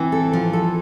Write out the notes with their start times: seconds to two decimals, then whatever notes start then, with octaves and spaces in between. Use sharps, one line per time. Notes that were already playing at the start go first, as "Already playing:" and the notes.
Already playing: E3 C4
0.12 A4
0.33 F3
0.53 A4